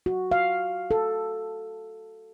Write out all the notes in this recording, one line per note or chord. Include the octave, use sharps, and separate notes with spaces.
F#4
F5
A4